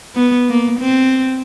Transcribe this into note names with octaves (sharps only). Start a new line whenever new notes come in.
B3
A#3
C4